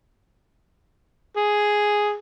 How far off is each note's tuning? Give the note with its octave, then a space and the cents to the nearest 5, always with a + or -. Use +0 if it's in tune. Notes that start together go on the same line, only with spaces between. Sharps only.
G#4 +0